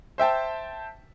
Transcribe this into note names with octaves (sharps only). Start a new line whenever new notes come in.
C5 E5 G5 A5